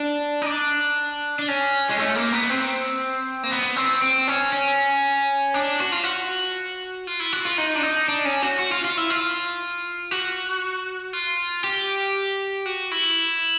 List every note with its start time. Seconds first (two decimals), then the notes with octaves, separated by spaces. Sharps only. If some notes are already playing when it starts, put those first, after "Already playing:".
Already playing: D4
0.42 D#4
0.46 D4
1.39 D4
1.48 C#4
1.89 G#3
1.99 A3
2.16 A#3
2.33 B3
2.49 C4
3.43 A#3
3.51 B3
3.76 C4
4.02 C4
4.28 C#4
4.53 C#4
5.54 D4
5.80 F#4
5.92 F4
6.03 F#4
7.07 F4
7.20 E4
7.33 F#4
7.45 F4
7.58 D#4
7.75 D4
7.83 D#4
8.08 D4
8.25 C#4
8.42 F#4
8.59 F#4
8.72 F4
8.85 F4
8.97 E4
9.10 F4
10.11 F#4
11.13 F4
11.64 G4
12.66 F#4
12.91 E4